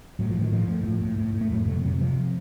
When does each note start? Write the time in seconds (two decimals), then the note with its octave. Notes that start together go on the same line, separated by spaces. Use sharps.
0.19 A2 F#3
0.30 F3
0.35 A2
0.41 D#3
0.52 A2 F3
0.68 A2
0.84 A2
1.02 A2
1.18 A2
1.34 A2
1.41 A3
1.51 F2 F#3
1.67 C3 A3
1.84 C3 F#3
2.00 C3 F3